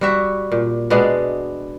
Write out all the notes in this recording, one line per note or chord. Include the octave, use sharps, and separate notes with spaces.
G3 F#4 E5
A#2
B2 G#3 B3 D4